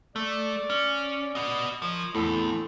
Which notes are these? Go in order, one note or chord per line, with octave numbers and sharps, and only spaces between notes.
A3 D5
C#4
B3 D#5
F3 A#4 C#5 D#5
E2 A2 D3 C4 A4